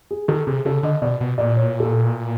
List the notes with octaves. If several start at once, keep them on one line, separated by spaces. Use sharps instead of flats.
G#4
D#3 A4
C3 G#4
C#3 A4
D3 D#5
B2 D5
B2
A#2 D5
C#5
A4